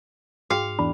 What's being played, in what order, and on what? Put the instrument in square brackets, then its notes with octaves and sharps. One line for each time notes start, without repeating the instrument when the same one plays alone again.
[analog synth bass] G#2 [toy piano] F#4 G#4 G5 [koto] F5
[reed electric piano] E2 D4 [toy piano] B5